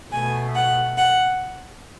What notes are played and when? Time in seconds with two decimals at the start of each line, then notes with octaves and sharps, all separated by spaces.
0.11 B2 A3 G#5
0.55 F#5
0.97 F#5